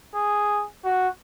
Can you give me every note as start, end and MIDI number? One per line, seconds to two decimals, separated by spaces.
0.15 0.64 68
0.85 1.08 66